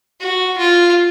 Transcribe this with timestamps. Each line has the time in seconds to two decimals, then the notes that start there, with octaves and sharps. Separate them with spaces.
0.21 F#4
0.58 F4